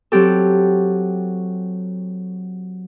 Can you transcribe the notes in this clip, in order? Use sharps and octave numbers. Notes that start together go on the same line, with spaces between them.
F#3 C4 G4 A4